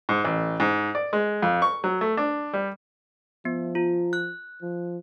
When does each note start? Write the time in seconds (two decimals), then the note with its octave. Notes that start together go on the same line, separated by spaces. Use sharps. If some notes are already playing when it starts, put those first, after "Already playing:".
0.09 G#2
0.25 A1
0.60 G#2
0.95 D5
1.13 G#3
1.42 F2
1.62 C#6
1.84 F#3
2.01 A3
2.17 D4
2.54 G3
3.45 F3 B3
3.75 F4
4.13 F#6
4.62 F3